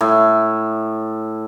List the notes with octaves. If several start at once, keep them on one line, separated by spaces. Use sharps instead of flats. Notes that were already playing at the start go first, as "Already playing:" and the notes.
A2